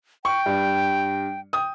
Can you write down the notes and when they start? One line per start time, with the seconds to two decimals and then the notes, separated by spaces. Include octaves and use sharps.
0.25 G5 C#6
0.46 G2
1.53 G5 D#6